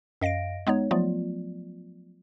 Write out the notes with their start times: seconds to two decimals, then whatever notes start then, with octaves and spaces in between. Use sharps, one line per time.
0.21 F#2 D#5 F5 A#6 D7
0.67 G#3 B3 D#4 C#5
0.91 F3 F#3 A3 B3 F4 D5